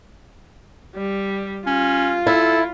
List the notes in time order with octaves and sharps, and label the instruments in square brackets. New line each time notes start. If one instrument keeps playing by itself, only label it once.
[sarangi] G3
[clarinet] C#4 [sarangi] F4
[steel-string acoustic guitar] E4 [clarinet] A4